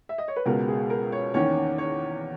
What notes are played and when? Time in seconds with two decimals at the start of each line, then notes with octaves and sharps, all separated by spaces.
0.09 E5
0.18 D#5
0.28 C#5
0.36 B4
0.46 C#2 B2 G#3 B3 A#4
0.68 G#4
0.90 A#4
1.12 C#5
1.34 E2 D#3 A#3 C#4 C#5
1.78 C#5